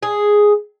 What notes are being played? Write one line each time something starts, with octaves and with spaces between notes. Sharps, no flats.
G#4